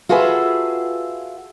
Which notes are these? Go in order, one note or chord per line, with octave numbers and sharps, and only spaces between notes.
F4 F#4 G#4 A4 B4 E5